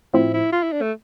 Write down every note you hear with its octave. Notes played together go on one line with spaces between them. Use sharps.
A2 F3 C4 E4
E4
F4
E4
D4
A3